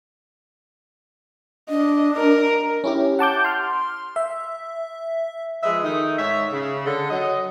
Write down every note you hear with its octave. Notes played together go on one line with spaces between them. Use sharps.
D4 D#5
A#4
C#4 E4 G4
F#5 A5 D6 G6
C6 F6
E5
F3 G#3 B4 D#5 E5
D#3 A3 D#4
G#2 C#5 E5
C#3
D3 A4
F#3 D#5